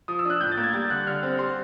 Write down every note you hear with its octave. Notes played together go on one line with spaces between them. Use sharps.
F3 D#6
E6
D4 F#6
A2 G6
A6
A#3
G#6
G3 A6
D3 F#6
D3 F6
C4
G3 C6